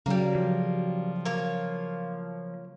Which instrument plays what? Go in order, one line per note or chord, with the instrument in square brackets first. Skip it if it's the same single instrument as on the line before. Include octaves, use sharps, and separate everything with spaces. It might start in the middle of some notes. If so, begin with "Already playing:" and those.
[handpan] C#3 F#3 [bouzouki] G3 A#3
[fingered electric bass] F3
[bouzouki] A#3 C#5